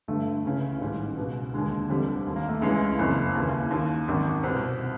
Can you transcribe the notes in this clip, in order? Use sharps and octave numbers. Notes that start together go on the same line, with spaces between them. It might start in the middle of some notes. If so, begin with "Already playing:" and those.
G1 G2 D3 A3
C#2 C#3 E3
A1 G#2 D#3 G3
C#2 B2
D#2 D3 G#3
F1 F2 D3 G3
D#2 D#3
A#3
A3
C#2 C#3 E3 G#3
F#1 F2 C#3 E3
D#2 C#3 E3
D#2 D#3
G#1 F#2 D#3
C2 B2 C4